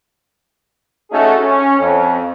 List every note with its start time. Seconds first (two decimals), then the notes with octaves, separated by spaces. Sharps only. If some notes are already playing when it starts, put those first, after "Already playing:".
1.11 A3 C#4 D#4 F#4 G#4 A4
1.40 C#4
1.80 F2